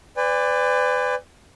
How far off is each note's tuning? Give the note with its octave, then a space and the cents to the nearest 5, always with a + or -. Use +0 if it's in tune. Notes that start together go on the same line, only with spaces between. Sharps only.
B4 +35 D5 +0 G#5 -40